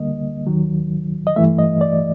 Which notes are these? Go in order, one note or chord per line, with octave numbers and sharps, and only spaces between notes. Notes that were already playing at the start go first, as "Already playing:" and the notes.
Already playing: D2 D3 G3 A#3 D#5
D#2 D#3 F#3
D#5
G2 E3 A3 E5
D#5
D5